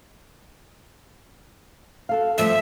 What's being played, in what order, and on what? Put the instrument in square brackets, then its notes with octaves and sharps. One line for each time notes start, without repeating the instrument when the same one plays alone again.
[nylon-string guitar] F#4 A4 F5
[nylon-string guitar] G2 F3 A3 [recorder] E5